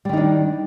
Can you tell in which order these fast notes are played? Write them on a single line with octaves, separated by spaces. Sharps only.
G3 D#3 D#4 D4